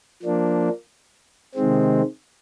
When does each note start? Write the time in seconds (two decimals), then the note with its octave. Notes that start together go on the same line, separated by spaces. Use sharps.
0.22 F3 A#3 D4
1.55 C3 D#3 G#3 C4